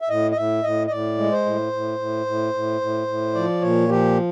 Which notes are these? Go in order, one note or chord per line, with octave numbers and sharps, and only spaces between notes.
E5
A2 D#5
D#5
A2 E5
A2 D#5
D#5
A2 D5
G#3
C5
A2
A2
A2
A2
A2
A2
A2
F3 D5
A#2 C#5
F3 G4